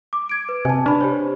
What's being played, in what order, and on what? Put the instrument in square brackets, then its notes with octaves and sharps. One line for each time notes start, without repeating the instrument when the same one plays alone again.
[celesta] D6
G#6 D7
B4
[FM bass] C3 [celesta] G#5 A5
[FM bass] D4 [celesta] B4 B5
[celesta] G4 C5 C#5